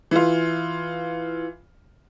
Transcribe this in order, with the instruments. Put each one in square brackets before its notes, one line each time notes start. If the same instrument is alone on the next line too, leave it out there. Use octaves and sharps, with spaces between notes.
[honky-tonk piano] E3 F4